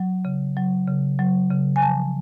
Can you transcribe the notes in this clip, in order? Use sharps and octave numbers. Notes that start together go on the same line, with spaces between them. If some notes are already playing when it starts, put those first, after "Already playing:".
Already playing: F#3
C#3
F#3
C#3
F#3
C#3
G#5
F3 A5